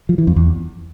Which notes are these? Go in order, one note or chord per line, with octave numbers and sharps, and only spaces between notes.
F3
E3
F2
E2